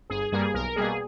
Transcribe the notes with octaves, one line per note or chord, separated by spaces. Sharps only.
G1 G#4
G2 G3 A#3 G#4
B1 A#4
B2 G3 A#3 G#4